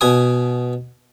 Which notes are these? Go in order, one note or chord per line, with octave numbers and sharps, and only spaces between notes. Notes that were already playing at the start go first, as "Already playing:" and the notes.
B2 G#5 D#6